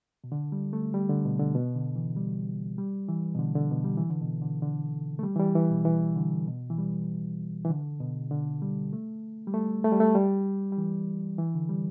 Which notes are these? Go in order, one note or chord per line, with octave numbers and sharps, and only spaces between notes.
B2
D3
G3
A3
G3
D3
B2
D3
B2
D3
E3
G3
G3
E3
B2
D3
D3
B2
G3
E3
D3
B2
D3
D3
A3
G3
E3
G3
E3
B2
E3
D3
B2
E3
G3
E3
D3
B2
D3
G3
A3
G3
A3
A3
G3
A3
G3
G3
E3
E3
D3
G3